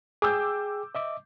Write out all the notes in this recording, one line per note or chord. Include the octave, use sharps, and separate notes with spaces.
G#4 G5 D6 E6 G6
D#5 E5 D6